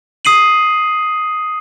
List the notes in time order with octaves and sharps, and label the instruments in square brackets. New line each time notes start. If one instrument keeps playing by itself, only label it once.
[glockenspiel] D#6 C7 D#7 F#7